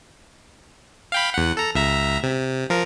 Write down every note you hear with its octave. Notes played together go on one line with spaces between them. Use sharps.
F5 G5 B5
E2 F#5
A4 A#5
C#2 E5 A#5
C3
F3 A#4